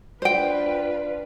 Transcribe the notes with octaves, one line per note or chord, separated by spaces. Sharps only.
D4 F4 B4 C5 D5 G5